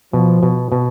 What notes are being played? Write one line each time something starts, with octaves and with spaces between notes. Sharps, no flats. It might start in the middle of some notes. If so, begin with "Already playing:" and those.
B2 F3
B2
B2